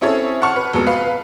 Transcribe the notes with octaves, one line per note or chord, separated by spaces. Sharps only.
C4 C#4 E4 G#4 A4 C#5
F#5 A5 C#6 F6 C#7
B4
F1 B2 G#3 C#7
B4 F5